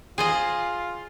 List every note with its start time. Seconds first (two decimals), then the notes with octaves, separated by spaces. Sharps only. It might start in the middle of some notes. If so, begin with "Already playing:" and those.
0.18 F4 G#4 C5 D#5